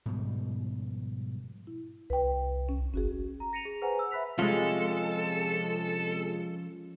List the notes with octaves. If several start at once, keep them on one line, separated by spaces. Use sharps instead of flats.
G#2 B2 F3 G3
E4
C2 B4 G5
C#4
G1 C#4 F#4 G#4
A#5
A#6 C#7 D#7 F7
G#4
G#4 B4 C5 F#5 G#5 A#5
E6
E5 B5 F#6 B6 F7
C3 F3 G#3 C#4 F4 A4